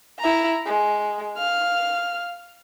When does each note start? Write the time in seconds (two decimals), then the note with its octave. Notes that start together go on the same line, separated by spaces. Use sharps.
0.19 E4 A#5
0.66 G#3
1.38 F5 F6